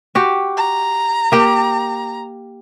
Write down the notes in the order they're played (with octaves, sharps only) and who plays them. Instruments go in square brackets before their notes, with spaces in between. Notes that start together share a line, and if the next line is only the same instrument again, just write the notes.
[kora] F#4 G4
[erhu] A#5
[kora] A#3 G4